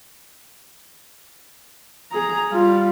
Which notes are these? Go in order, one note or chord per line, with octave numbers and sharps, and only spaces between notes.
G#4 A#5
G3 F4